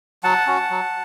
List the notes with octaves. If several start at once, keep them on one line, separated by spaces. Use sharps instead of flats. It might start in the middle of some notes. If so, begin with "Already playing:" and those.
F#3 F#5 A5
C#4 F#4
F#3